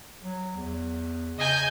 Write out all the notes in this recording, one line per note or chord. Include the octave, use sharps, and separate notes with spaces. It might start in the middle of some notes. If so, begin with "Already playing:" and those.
F#3
E2
C#3 D#5 G#5 G6